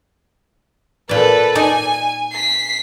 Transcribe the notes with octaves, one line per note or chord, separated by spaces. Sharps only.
A#2 A4 B4 D5
D#4 D5 G#5
B6 C7